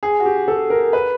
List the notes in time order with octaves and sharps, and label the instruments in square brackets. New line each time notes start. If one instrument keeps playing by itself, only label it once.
[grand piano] G#4
F#4
G4
A4
A#4
B4